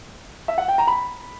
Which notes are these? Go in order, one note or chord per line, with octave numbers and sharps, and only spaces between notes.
E5
F#5
G5
A#5
B5